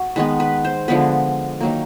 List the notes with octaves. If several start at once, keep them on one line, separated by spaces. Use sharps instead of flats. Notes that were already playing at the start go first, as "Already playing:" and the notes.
Already playing: F#4
D#3 G#3 B3 B4
B4
C5
D3 F3 G#3 B3 B4
D#3 F#3 A#3